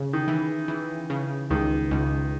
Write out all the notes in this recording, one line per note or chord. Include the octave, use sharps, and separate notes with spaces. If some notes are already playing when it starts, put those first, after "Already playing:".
Already playing: C#3
D#3
E3
E3
C#3
C#2 D#3
C#2